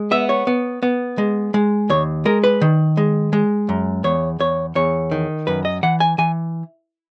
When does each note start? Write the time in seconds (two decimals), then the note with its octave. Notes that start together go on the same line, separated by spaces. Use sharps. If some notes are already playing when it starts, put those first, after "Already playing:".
Already playing: G#3
0.11 B3 E5
0.29 C#5
0.47 B3
0.83 B3
1.18 G#3
1.54 G#3
1.90 D#2 C#5
2.25 G#3 A#4
2.44 B4
2.62 D#3
2.97 G#3
3.33 G#3
3.69 F#2
4.04 E2 C#5
4.40 E2 C#5
4.75 E2 C#5
5.11 D#3
5.47 F#2 B4
5.65 D#5
5.83 E3 F#5
6.00 G#5
6.18 E3 G#5